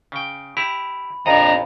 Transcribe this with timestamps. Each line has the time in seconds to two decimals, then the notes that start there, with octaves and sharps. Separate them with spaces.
0.12 C#3 G5
0.57 E4 G4 B5
1.26 A#1 F2 D4 D#5 A#5